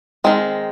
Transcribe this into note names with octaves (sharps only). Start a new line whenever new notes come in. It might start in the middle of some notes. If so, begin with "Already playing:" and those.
D#3 G#3 C4